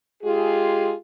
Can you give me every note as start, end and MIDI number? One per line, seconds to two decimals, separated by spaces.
0.23 0.93 56
0.23 0.93 65
0.23 0.93 67
0.23 0.93 68